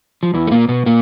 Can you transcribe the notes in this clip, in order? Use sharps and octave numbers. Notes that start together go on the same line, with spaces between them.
F3
E2 E3
A3
A#2 A#3
B2 B3
A#2 A#3